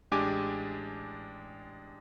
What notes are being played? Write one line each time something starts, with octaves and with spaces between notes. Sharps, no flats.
A1 G#3 D4 G4 G#5 D6